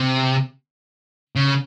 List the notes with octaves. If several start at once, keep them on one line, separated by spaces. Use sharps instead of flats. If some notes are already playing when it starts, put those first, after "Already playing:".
Already playing: C3
C#3